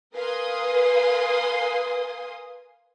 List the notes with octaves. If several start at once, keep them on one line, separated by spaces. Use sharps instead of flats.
A#4 B4 F5 G#5 C6 D#6